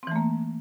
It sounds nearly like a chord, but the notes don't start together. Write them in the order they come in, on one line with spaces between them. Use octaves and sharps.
C4 E3 A3 A#3